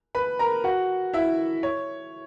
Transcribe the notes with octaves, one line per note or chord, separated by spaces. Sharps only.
B4 B5
A#4 A#5
F#4 F#5
E4 E5
C#5